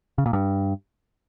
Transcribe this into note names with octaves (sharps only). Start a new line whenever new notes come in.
C#3
A#2
G2